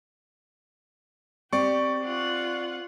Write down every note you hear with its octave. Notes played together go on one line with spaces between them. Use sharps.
C4 G4 D5 C#6
F4 F#5